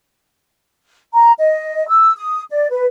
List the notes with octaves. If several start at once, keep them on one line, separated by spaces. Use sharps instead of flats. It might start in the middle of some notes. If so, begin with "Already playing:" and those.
A#5
D#5
E6
D#6
D5
B4